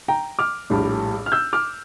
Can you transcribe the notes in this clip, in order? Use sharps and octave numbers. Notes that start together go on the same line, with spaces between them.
G5 A#5
D6 F6
A#1 A2 G3
F6
E6 G6
D6 F6